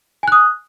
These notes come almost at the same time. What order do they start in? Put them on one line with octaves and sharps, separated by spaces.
G#5 F#6 D#6